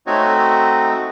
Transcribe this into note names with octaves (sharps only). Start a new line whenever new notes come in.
A3 C4 D#4 F#4 C#5